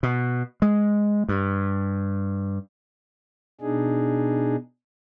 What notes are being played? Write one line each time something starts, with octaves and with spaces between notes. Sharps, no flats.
B2
G#3
G2
B2 D4 D#4 G#4